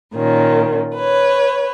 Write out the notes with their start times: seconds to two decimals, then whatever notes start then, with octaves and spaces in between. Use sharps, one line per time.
0.14 A#2 D#3 C#4
0.97 B4 C#5